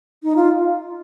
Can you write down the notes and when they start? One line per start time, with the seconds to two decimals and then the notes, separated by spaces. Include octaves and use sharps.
0.23 D#4
0.36 F4